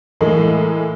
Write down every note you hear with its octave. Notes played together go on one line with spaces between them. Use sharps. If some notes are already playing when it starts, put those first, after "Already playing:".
A2 E3 G#3 A#3